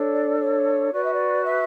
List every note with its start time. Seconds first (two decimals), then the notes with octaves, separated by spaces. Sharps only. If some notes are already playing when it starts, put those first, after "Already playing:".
Already playing: D4 A4 C#5
0.12 D5
0.38 C#5
0.91 F#4 B4 D5
1.02 E5
1.12 D5
1.43 E5